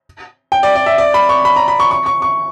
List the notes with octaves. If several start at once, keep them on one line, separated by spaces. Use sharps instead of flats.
G5
D5
D5
E5
D5
B5
C#6
B5
A#5
B5
C#6
C#6
C#6
C#6